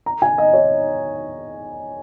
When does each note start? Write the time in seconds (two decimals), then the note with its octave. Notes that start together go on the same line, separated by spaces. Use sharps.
0.06 A#5
0.22 G#5
0.38 D#5
0.53 C#5